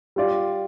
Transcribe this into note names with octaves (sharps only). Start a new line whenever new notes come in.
G3 F4 D5